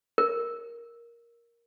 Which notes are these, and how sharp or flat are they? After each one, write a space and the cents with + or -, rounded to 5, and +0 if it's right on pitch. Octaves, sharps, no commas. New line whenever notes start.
A#4 +10